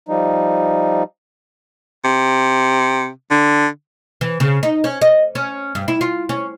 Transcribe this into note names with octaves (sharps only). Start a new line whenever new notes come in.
F3 G3 D#4
C3
D3
E3
C#3
D#4
C#4
D#5
C#4
G2
E4
F4
C#4